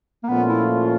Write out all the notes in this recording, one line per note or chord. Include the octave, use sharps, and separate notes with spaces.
A#3
A#2 F3 A3 B3 C#4 F4
E4